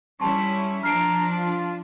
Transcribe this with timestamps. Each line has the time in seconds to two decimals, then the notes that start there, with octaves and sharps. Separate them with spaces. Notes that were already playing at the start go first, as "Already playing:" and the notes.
0.20 G3 C#4 E4 A5 C6 C#6
0.83 F3 D4 A#5 F6 C7 D7
1.36 F4